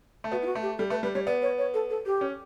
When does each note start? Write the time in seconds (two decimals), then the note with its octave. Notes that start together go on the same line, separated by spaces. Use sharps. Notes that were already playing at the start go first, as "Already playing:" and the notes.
0.24 A3
0.31 B3 F#4
0.42 E4
0.46 F#4
0.55 A3
0.62 G4
0.78 G3 A4
0.90 A3 B4
1.03 G3 B4
1.15 G3 C#5
1.26 B3 D5
1.42 C#5
1.58 C#5
1.74 A4
1.90 A4
2.06 G4
2.21 C#4